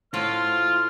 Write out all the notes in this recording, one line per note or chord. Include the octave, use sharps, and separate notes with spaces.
A2 F4 C5 F6